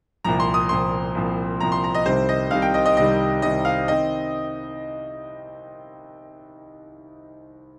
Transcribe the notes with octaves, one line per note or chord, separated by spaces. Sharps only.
C2 A#2 F3 C4 A#5
C6
D#6
C2 A#2 F3 C4 C6
C2 A#2 F3 C4
C2 A#2 F3 C4 A#5
C6
A#5
D#5
C2 C3 D#3 G3 C5
D#5
C2 C3 D#3 G3 F5
G5
D#5
D#5
C2 C3 D#3 G3 D#5
C2 C3 D#3 G3 D#5
F5
D#3 C4 D#5